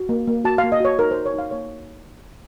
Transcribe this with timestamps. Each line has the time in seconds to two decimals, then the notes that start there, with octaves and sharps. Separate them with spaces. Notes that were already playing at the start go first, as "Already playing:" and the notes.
Already playing: F#4
0.09 A#3
0.27 A#3
0.45 F#4 A5
0.58 F5
0.64 A#3
0.72 D#5
0.80 F#4 C#5
0.99 D#4 A#4
1.11 D#4 C5
1.26 C#5
1.34 D#4 F5
1.51 A#3 C#5